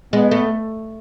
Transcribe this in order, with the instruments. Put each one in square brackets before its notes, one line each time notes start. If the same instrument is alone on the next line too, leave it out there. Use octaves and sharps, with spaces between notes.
[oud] G#3 [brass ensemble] B3
[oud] A3